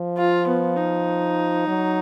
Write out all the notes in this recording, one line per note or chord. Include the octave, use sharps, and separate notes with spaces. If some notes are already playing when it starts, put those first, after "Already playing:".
Already playing: F3
F4
B3
D#4
F#3